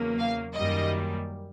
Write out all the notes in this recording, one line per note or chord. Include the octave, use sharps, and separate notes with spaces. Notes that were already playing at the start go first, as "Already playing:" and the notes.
Already playing: E2 C#3 F#3 A#3
F5
F#2 D#3 G3 A#3 D#5